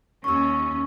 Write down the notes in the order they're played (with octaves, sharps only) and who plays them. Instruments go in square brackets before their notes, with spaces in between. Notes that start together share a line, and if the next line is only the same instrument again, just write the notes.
[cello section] D#2 C#4 [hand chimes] C#6 E6